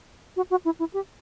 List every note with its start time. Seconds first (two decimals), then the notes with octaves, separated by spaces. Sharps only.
0.36 F#4
0.50 F#4
0.65 E4
0.79 E4
0.94 G4